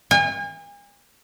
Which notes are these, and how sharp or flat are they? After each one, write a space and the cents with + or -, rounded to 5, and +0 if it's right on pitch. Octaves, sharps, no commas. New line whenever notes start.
G#5 -40